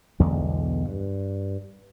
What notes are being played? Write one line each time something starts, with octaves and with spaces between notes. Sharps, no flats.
B1 E2 D3 G#3
G2